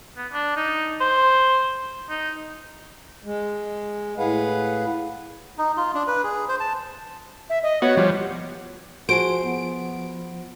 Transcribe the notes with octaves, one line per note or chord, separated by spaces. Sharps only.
B3
D4
D#4
C5
D#4
G#3
A2 G#4 B4 F5 F#5
D#4
F4
D4
B4
G#4
C5
A5
E5
D#5
B3 F#4 C#5
F3 G3
F3 F#4 G#4 C5 D7
B3